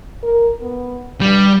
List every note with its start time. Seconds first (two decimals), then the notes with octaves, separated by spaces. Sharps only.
0.23 A#4
0.62 B3
1.21 G2 G3